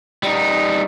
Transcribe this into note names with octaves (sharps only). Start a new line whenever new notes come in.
G3 D#4